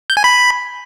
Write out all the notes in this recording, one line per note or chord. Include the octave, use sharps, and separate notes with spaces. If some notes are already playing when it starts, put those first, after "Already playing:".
G6
G#5
B5